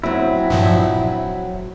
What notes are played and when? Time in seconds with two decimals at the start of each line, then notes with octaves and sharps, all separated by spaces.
0.04 F#3 C4 E4
0.50 G2 A#2 F3